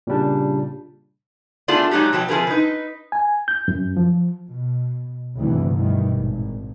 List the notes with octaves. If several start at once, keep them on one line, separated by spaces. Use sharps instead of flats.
A#2 C#3 G3 D4
A3 B3 D4 F4 G#4 D5
F#3 G#3 D#4 F#4 G4
B2 F3 F#3 G5
C3 F3 G#4 A#4 B4
D#4 B4
G#5
G6
F#2
F3
B2
G1 D2 G2 C3 D#3 E3
G2 B2 D#3 E3 G3
G#1 A#2